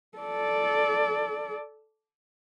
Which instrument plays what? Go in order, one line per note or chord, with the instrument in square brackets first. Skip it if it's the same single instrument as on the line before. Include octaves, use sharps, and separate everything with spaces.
[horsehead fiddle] A4 D5